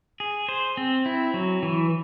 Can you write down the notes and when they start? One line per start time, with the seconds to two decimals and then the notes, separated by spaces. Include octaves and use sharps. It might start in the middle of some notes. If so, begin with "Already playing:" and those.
0.20 G#4
0.49 C5
0.77 C4
1.06 E4
1.34 F#3
1.63 E3